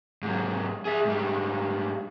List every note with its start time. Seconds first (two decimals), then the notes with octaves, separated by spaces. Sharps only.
0.23 G#2 F#3
0.85 G#4 E5
1.05 G#2 G3